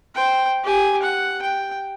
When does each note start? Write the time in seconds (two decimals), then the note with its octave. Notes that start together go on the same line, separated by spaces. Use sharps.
0.15 C5 G5
0.63 G4 G#5
1.02 F#5
1.42 G5